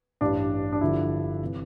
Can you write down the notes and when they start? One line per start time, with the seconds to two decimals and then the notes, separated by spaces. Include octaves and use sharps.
0.21 A1 G2 E3 G3 D4
0.73 D4
0.81 G1 G2 D3 F3 E4
1.43 C3 E3